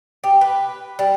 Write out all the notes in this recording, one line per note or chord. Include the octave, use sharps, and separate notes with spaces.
G4
B4
G3